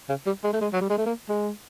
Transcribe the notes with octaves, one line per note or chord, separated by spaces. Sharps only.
C#3
G3
G#3
A3
G#3
F#3
G3
G#3
A3
A#3
G#3